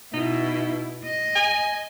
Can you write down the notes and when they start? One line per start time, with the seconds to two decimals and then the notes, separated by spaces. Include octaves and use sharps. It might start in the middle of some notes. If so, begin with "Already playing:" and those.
0.14 B2 D#4 E4
1.05 D#5
1.35 G#5